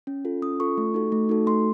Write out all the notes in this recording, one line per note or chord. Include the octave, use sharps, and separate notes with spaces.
C#4
F4 A4
C#4 D#6
F4 A4 C#6
A3
D#4 F#4 A4
A3
D#4 F#4 A4
A3 C6